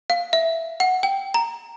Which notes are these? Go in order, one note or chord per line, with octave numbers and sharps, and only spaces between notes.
F5
E5
F#5
G5
A#5